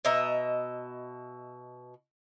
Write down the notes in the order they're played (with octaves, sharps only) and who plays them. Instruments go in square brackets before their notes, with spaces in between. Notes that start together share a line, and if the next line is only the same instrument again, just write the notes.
[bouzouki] B2 D#5 E5 A#5